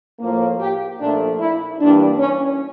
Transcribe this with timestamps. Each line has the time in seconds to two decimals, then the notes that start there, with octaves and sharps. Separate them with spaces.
0.20 A2 F3 A#3
0.59 G4
0.99 A#2 F3 A3 D4
1.39 E4
1.79 G2 E3 G3 A#3 D4
2.19 C#4